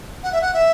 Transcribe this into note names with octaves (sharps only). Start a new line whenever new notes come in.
F#5
E5
F#5
E5